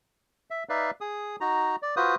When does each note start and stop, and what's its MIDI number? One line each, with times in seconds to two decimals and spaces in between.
0.50 0.64 76
0.69 0.91 63
0.69 0.91 71
0.69 0.91 74
0.69 0.91 76
0.69 0.91 77
1.01 1.36 68
1.01 1.36 87
1.41 1.76 63
1.41 1.76 66
1.41 1.76 82
1.82 1.95 74
1.97 2.15 65
1.97 2.15 66
1.97 2.15 71
1.97 2.15 72
1.97 2.15 87